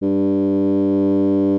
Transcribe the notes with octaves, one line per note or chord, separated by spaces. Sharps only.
G2